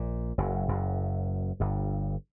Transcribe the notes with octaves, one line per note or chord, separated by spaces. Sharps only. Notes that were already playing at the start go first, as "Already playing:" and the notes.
Already playing: A#1 A#2
F#1 F#2
F#1 F#2
G1 G2